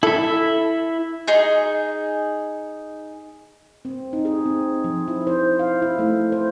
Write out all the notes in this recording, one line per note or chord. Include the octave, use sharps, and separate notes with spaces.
E4 A4 E5
D#4 G#4
C4
D#4
G#4
C4
F3
E4
C5
F5
E4
A3
C5